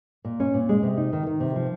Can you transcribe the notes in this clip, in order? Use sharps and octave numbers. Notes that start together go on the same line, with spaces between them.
A#2
C#4
A#2
G#3
C3
D#4
D#3
D#3
C3
F3